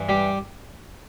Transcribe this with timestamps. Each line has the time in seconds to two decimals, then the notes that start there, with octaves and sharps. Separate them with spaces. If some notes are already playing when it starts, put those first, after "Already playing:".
Already playing: G2 E3
0.09 G3 G4